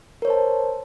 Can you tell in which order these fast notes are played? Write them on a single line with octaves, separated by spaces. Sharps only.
A#4 C#5 C5 A5